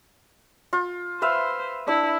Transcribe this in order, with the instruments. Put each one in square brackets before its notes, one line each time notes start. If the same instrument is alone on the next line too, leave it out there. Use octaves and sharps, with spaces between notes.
[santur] F4
[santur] B4 E5 F5 [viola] C5
[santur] D4 [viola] E4